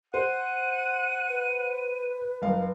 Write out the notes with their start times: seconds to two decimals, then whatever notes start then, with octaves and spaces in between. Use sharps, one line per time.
0.14 C5 F#5 D#7
1.28 B4
2.42 F#1 F5